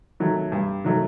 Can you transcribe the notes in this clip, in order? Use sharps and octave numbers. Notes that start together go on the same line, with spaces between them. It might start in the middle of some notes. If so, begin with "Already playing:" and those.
D#3 F#3 A3
G2
D#3 F#3 A3